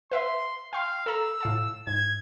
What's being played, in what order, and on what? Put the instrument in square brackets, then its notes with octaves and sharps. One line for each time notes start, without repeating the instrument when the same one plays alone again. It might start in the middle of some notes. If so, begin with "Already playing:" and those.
[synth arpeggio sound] B4 E5 F5 [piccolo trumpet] C6
[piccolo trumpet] F5 [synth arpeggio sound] G5 C6
[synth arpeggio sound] A4 A#5 [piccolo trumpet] E6
[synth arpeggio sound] A2 F5 A5
[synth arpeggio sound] G#2 [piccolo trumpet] G#6